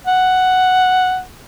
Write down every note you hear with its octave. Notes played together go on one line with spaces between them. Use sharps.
F#5